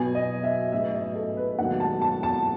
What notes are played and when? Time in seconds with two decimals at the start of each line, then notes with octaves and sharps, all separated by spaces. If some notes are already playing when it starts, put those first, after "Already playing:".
Already playing: B1 B2 F#3 B3 G#5
0.15 D#5
0.44 E5
0.72 A1 G#2 F#3 B3 E5
0.94 D#5
1.15 A4
1.37 B4
1.59 E1 D#2 D#3 F#3 A3 F#5
1.80 A5
2.02 A5
2.23 A5